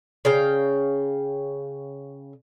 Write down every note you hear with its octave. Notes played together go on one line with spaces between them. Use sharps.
C#3 F5 G5